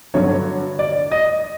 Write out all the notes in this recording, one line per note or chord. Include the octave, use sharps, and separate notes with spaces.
G2 D3 F#3 C#5
D5
D#5